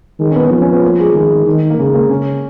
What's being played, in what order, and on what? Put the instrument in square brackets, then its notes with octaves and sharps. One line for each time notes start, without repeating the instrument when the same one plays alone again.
[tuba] D#3 [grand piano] G#3
[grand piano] C#4
B3
[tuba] F3 [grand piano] B3
[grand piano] C#4
B3
A#3
G#3
[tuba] D#3 [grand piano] G#3
[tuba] D#3
[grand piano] A#3
[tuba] C#3 [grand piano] G#3
[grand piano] A#3
[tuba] C#3 [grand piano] C#4